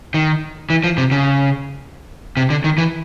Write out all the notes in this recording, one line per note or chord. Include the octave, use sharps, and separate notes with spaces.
D#3
E3
F3
C3
C#3
C3
D3
D#3
E3